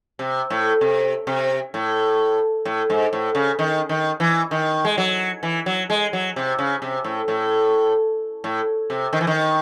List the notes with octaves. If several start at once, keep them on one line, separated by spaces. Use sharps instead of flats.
C3
A2
C3
C3
A2
A2
G#2
A2
C#3
D#3
D#3
E3
D#3
G#3
F#3
E3
F#3
G#3
F#3
C3
C#3
C3
A2
A2
A2
C3
D#3
E3
D#3